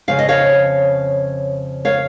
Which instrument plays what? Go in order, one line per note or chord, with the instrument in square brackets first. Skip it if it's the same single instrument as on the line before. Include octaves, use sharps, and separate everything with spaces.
[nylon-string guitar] F2 C#3 F3 F5
D#5
C#5 F5
C#5 F5